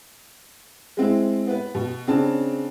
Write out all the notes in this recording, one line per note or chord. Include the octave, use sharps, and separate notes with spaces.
G#3 C4 E4
B3 B4
B2
C#3 C4 D4 A5